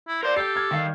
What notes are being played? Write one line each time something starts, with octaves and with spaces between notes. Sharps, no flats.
E4
A#4 C5 D5
G4 A4 G6 C7
F6 G#6
G2 D#3 F5